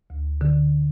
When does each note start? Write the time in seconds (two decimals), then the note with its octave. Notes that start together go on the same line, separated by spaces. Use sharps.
0.10 D2
0.41 D3